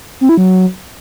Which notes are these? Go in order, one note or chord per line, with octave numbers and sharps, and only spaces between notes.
C4
E4
F#3